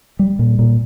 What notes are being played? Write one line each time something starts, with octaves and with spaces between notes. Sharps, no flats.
G3
A#2
A#2